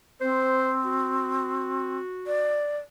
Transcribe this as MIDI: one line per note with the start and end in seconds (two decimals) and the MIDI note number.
0.21 1.97 60
0.21 0.72 72
0.84 2.64 66
2.27 2.78 74